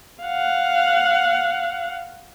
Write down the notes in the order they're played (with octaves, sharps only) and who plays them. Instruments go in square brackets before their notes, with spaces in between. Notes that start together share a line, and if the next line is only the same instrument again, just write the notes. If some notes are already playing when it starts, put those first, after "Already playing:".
[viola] F5 F#5